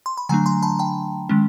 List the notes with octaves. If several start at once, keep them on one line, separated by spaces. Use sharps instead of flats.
C6
B5
D3 F#3 A3 D4 G#5 A#5
A#5 C6
A5 B5
G5 A5
D#3 G#3 C#4